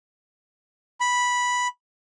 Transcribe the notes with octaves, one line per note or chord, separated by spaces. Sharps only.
B5